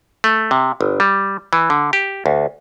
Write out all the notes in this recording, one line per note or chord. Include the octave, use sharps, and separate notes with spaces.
A3
C3
G1
G3
E3
D3
G4
D2